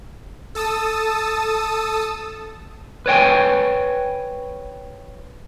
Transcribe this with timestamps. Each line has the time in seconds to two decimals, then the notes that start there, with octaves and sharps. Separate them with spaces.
0.55 A4 A5 D#6 E6
3.06 B4 C#5 G5 G#5